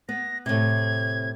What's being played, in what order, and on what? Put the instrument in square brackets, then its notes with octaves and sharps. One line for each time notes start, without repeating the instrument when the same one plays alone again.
[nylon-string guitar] B3 [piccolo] A#6
[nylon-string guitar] A2 C3 [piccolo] G#6